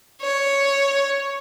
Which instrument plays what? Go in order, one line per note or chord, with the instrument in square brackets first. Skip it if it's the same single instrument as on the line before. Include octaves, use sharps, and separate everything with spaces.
[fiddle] C#5